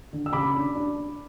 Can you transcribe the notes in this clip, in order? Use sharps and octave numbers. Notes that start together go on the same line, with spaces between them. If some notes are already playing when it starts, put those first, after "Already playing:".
D3
E6
C#3 B5 D6
D4
D4
D4